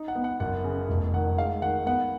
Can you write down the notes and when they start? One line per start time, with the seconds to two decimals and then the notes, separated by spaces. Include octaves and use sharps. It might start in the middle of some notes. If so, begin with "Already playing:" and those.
Already playing: D#4
0.08 F#5
0.15 B3
0.24 F#5
0.40 F#1 F#5
0.64 C#3
0.89 F1
1.14 D#3 F#5
1.37 G#3 F5
1.62 D#3 F#5
1.86 B3 F#5